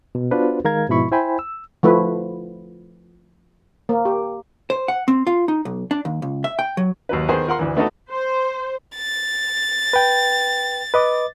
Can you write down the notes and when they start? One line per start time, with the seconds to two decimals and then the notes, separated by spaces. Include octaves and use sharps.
0.15 B2
0.31 B3 D4 F4 F#4 B4 C5
0.65 D#3 G#3 A#4 F5 A#5 G#6
0.89 G#2 B2 F3 E4 B5 C#6
1.12 E4 C5 G5 G#5 B5
1.39 E6
1.83 F3 A3 E4 B4
3.89 A#3
4.05 G4
4.70 C5
4.88 F#5
5.08 C4
5.27 F4
5.48 D#4
5.65 B1
5.91 D4
6.05 D#2
6.22 C#2
6.44 E5
6.59 G5
6.77 F#3
7.09 D#2 F#3 B4
7.29 D#3 B3 G#4 C5
7.47 F4 A#4 F#5 C6
7.59 D2 E3
7.77 A3 B3 D4 D#4 F#4 A4
8.10 C5
8.96 A6
9.93 B4 G5
10.94 B4 D#5 D6